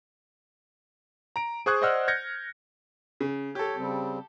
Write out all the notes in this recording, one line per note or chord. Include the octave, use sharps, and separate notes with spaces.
A#5 D7
G#4 C5 C#6 D#6 F#6 G#6
C5 D5 D#5 F#5 E6 F6
F6 G6 G#6 A#6 C#7
C#3
G4 A4 C#5
C#3 G3 C4